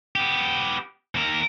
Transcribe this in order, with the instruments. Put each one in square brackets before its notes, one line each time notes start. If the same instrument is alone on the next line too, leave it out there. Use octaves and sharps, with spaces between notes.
[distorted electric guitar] B3 G4
D#2 A#4